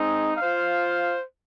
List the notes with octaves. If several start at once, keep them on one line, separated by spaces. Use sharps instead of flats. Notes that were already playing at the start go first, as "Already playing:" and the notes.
Already playing: G#3 C4 D#4
F4 C5 F5